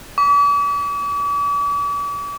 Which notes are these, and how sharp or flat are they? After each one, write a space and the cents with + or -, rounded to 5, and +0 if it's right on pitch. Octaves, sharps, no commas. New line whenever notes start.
D6 -45